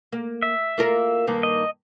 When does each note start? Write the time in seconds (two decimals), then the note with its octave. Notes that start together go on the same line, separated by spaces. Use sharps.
0.12 A#3
0.42 E5
0.78 A#3 F4 A#4
1.27 G2 D#3 A#3
1.43 D#5